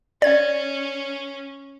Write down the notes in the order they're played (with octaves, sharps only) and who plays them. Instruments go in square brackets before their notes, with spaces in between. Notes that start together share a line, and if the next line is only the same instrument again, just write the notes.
[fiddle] C#4 [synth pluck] D5 G#6